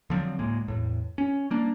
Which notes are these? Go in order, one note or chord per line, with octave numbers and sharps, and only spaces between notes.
D3 F3 F#3 C4
D2 A2 G#3 A#3
E2 A2
C#4
G3 A#3 D4